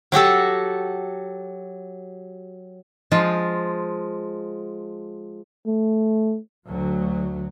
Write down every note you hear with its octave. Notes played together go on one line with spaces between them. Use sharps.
F#3 F#4 G4 A4
F3 G#3 F4
A3
D2 F#3